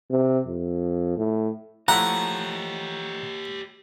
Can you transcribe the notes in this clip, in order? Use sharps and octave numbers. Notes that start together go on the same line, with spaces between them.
C3
F2
A2
F3 A3 E4 G4 C#5 F#5 A#5